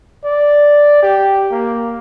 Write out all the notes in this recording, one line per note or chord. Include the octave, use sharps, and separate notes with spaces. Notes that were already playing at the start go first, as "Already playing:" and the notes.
D5
G4
A#3